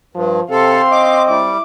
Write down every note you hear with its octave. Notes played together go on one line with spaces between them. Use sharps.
G2 F3
C3 C4 A4 F5 C6
D#5 D6
G3 E4 D6